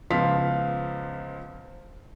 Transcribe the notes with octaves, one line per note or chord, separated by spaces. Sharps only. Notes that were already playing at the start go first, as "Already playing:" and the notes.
C#2 F3 B3 F5 C6 B6